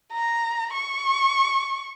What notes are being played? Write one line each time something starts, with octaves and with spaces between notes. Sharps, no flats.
A#5
C#6